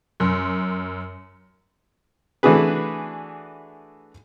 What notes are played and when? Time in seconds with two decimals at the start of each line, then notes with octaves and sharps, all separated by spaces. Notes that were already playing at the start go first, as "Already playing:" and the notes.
0.20 F#2 C6
2.43 E3 A3 D4 F#4 G#4 B4